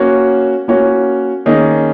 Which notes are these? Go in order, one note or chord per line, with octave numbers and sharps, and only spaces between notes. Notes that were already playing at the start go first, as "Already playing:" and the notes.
Already playing: A#3 C#4 F#4 C#5
A#3 C#4 F#4 C#5
D#3 A#3 C#4 G#4 D#5